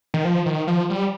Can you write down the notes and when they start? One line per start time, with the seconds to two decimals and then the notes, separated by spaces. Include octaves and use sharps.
0.14 D#3
0.25 F3
0.46 D#3
0.67 F3
0.90 G3